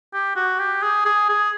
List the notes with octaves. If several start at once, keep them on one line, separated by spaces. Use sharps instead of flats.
G4
F#4
G4
G#4
G#4
G#4